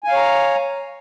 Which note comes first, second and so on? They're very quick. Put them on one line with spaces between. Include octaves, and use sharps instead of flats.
G#5 F5 C#5 A#5